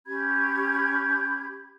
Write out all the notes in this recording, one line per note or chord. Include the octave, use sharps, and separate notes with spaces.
C#4 G4 B5 G#6